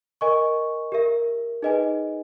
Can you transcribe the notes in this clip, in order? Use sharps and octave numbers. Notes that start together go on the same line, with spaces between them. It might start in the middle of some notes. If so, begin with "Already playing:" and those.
A#4 D#5 G#5 C#6
G4 A#4 E5
D#4 G#4 B4 D#5 G#5